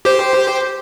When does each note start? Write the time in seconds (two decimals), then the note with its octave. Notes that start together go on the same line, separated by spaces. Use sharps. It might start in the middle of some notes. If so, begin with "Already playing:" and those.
0.05 G4 C5